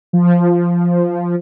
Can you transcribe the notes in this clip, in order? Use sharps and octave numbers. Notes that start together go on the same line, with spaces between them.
F3